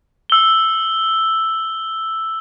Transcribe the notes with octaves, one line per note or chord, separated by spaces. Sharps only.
E6 G7